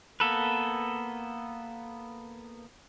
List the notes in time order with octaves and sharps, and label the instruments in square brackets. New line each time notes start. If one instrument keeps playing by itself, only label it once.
[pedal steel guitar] A#3 B3 A4 B4